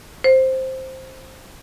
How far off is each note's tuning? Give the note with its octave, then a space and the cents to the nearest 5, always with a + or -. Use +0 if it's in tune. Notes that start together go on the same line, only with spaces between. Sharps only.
C5 +5